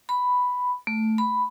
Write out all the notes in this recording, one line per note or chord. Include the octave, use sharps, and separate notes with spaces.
B5
A3
B5